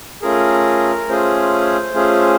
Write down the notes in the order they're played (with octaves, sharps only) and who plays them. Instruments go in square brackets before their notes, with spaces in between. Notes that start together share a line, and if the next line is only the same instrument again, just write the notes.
[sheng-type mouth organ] A3 C#4 F4 G#4 A#4
A3 C#4 F4 G#4 C5
A3 C#4 F4 G#4